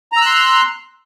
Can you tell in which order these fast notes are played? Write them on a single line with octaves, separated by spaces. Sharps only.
A#5 E6 F#6 C6